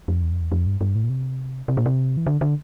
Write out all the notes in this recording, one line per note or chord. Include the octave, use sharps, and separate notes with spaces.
F2
E2
F2
E2
F2
G2
G2
A2
A#2
C3
C3
A#2
C3
E3
D3
D3